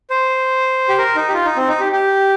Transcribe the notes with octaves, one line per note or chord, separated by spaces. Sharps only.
C5
G4
A#4
D#4
G4
F4
D#4
C4
D#4
G4
G4